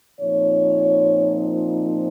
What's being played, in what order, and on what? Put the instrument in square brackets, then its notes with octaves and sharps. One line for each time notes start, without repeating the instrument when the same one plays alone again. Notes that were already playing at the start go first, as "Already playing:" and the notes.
[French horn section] A#2 F3 C4 D#4 C#5